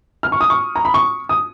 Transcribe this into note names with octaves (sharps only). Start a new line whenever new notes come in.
F6
C#6
D#6
C#6
A#5
B5
C#6
D#6